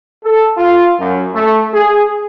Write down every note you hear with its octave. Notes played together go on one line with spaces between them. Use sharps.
A4
F4
F#2
A3
G#4